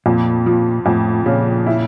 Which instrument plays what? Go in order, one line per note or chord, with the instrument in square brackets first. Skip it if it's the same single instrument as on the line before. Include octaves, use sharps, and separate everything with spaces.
[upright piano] F2 [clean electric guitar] A#2
[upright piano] F3
[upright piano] F2 [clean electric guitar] A2
[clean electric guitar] A#2 [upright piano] C#3
[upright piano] E4